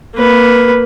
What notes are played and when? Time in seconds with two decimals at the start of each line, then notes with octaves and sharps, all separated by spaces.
0.15 A#3 B4